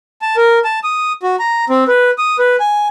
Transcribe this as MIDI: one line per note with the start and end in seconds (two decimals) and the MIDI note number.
0.22 0.36 81
0.37 0.59 70
0.65 0.80 81
0.84 1.13 87
1.23 1.36 66
1.39 1.65 82
1.70 1.84 60
1.88 2.11 71
2.18 2.37 87
2.39 2.56 71
2.60 2.88 80